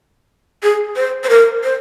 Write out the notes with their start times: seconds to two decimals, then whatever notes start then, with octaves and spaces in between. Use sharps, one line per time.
0.63 G#4
0.96 C5
1.24 C5
1.29 A#4
1.64 C5